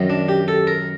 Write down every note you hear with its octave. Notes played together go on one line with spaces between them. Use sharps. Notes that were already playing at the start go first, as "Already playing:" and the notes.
Already playing: F#2 D#3 F#3
D4
G4
A4
A#4